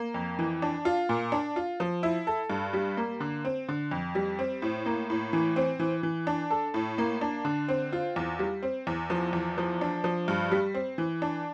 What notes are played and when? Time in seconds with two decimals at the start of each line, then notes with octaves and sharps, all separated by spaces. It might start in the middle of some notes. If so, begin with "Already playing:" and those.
Already playing: A#3
0.14 F2
0.39 E3
0.62 D4
0.85 F4
1.09 A#2
1.32 D4
1.56 F4
1.80 F3
2.03 E4
2.27 A4
2.50 G2
2.73 G3
2.97 A#3
3.20 D3
3.45 C4
3.69 D3
3.91 F2
4.15 G3
4.39 C4
4.62 A2
4.86 A#3
5.10 A2
5.33 E3
5.56 C4
5.79 E3
6.03 E3
6.27 D4
6.50 A4
6.74 A2
6.98 A#3
7.21 D4
7.45 D3
7.68 C4
7.92 F4
8.16 E2
8.39 G3
8.63 C4
8.87 E2
9.10 F3
9.33 E2
9.58 F3
9.81 D4
10.04 F3
10.28 G2
10.52 G3
10.75 C4
10.98 E3
11.22 D4